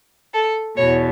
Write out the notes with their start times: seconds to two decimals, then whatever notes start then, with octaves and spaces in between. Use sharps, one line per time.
0.34 A4
0.76 E2 B2 C#5